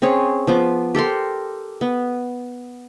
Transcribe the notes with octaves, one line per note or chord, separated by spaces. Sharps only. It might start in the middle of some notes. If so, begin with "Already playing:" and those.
C4 C#4 G#4 C#5
F3 B3 D6
G4 A4 A#4 C6
B3